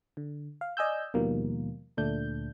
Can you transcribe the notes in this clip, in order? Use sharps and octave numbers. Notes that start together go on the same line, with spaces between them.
D3
F5
D5 D#5 G#5 E6 G6
D#2 B2 D#3 F3 G3 A#3
D2 A#2 A3 D4 G6